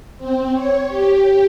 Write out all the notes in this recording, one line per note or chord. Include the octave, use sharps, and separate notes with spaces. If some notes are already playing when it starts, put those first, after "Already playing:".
C4
C#5
G4